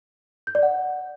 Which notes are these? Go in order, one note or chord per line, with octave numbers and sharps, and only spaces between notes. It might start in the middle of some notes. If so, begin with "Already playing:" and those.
G6
D5
F#5